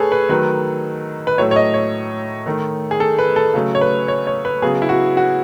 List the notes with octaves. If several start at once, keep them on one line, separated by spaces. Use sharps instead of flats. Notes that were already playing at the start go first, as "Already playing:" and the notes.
Already playing: A3 G#4 A4 B4 C#5
B4
D#3 F#3 A3 B4
B4
A2 F#3 A3 C#5
C#5
D#5
C#5
D#3 A3
G#4
A4
B4
A4
C#3 F#3 A3
C#5
B4
C#5
C#5
B4
C#3 F#3 B3 G#4
E4
F#4
F#4